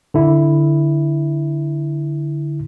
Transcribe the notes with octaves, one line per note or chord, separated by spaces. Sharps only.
D3 E4